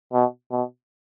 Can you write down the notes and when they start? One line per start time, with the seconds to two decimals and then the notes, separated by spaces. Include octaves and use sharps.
0.13 B2
0.51 B2